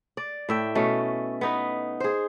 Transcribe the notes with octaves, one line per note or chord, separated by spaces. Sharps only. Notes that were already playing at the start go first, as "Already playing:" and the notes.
D5
A2 E5 G5
B2 A3 C#4
B3 D#4 B4
G#4 C5